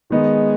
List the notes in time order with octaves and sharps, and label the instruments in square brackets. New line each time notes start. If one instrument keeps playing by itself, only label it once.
[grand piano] D#3 B3 D#4 [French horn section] G#3